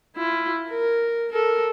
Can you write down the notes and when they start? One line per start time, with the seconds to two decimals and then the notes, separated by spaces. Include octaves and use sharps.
0.16 E4 F4
0.69 A#4
1.32 A4 A#4